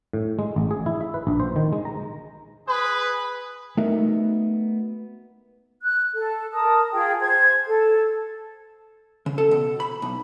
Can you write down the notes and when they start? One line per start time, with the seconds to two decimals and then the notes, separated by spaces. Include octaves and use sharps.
0.13 A2
0.39 G#3
0.56 A1
0.71 G#4
0.86 E4
1.01 E5
1.14 B4
1.27 A#1
1.40 C5
1.56 D#3
1.73 G#3
1.85 A#5
2.66 G#4 B4
3.77 A3 B3 D#4 F#4 A#4 E5
5.83 F#6
6.14 A4
6.53 A#4 A5 D#6
6.92 F4 G#4 G5
7.21 C5 G#6
7.66 A4
9.26 C#3
9.38 A4
9.51 B2
9.80 B5
10.02 B1